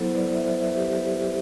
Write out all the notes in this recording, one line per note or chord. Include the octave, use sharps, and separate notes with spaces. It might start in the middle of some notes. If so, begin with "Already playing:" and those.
Already playing: F#3 B3 E4 A4 C5
B4 D5
C5 E5
G4 B4